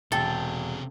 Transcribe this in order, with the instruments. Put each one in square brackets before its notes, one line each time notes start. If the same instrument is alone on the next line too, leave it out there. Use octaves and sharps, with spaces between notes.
[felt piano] E1 [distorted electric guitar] C3 G#4 [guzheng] A4 [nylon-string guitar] G5